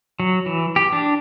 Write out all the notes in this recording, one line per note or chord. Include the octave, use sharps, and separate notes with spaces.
F#3
E3
G4
D4